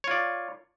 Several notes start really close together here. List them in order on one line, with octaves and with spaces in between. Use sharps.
C#5 F4 D5